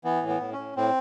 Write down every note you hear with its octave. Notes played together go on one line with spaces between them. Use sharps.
E3 B3
A2
B3
A2
C#4
A2
A2 C4